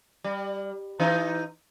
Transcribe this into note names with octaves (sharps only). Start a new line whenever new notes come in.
G3
E3 D#4